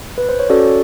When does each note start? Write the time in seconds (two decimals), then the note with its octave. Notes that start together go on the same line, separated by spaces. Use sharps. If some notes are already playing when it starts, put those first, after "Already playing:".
0.18 B4
0.29 C5
0.39 C#5
0.50 C#4 F#4 A4 D5